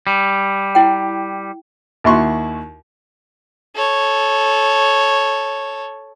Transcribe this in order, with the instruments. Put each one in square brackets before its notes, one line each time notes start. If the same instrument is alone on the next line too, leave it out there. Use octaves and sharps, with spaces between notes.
[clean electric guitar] G3
[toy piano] E4 G5
[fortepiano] D#2 E4 F#4 C6 C#6
[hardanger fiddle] A4 C#5